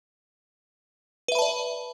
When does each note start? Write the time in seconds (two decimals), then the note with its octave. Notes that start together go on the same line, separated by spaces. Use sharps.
1.28 B4
1.32 E5
1.35 B5
1.39 A5
1.42 D5